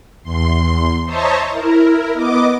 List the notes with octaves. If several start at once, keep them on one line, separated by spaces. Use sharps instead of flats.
E2 C6
C5 C#5 D#5 E5 A5 A#5
E4 A#4
B3 D#5 D6